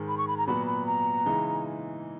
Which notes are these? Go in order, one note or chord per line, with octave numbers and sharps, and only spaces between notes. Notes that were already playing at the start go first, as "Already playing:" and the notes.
Already playing: G#2 D#3 G#3
B5
C#6
B5
A#5
A#2 F#3 B3 F#4 B5
B5
A#5
C#3 E3 G#3 D#4